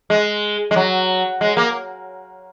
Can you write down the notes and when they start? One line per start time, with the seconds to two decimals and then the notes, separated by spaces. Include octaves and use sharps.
0.10 G#3
0.71 G#3
0.76 F#3
1.41 G#3
1.57 A#3